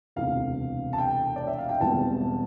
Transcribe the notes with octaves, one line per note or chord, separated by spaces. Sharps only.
E1 D2 C3 E3 F5
A5
G5
D5
E5
F5
G5
E1 E2 E3 G3 C4 A5